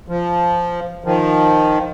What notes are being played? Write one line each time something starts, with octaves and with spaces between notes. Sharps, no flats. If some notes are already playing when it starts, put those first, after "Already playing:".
F3
D#3 F3